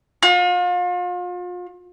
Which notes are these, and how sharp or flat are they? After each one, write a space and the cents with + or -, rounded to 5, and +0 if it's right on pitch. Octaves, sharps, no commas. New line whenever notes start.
F4 +35